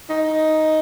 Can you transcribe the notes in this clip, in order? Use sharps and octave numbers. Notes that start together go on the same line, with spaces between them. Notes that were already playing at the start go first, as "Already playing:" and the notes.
D#4